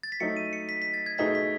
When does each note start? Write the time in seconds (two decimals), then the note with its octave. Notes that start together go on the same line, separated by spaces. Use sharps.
0.03 A6
0.12 B6
0.20 F#3 A3 D#4 C#7
0.37 D#7
0.53 C#7
0.69 B6
0.82 B6
0.94 A6
1.06 G#6
1.18 B2 A3 D#4 G#4 B6
1.35 B6